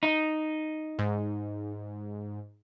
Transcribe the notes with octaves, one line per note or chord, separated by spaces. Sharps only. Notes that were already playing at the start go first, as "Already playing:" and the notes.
D#4
G#2